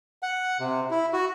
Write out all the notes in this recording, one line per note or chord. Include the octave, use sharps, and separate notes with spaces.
F#5
C3
E4
F#4